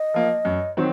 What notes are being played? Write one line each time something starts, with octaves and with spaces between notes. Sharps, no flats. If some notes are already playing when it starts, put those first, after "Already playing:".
Already playing: D#5
F3 A#3
F#2
D#3 F#3 C4